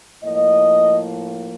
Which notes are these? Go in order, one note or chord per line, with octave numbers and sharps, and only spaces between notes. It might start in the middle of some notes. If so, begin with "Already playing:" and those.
A2 F3 A#3 D#5